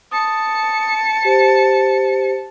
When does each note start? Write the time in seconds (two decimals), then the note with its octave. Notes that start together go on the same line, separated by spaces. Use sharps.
0.11 A5 D#6 C#7
1.25 G4 C5